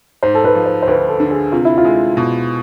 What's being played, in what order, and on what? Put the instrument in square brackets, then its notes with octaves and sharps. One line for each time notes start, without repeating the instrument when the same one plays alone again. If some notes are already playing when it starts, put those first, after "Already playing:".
[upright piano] G#2 [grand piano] C5
[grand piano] A4
B4
[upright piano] F3
[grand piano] C5
C5
[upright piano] D2 [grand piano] B4
[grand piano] A4
[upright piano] D3
[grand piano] G#4
[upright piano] C3 [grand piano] F4
[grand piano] E4
F4
[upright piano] G#3
B2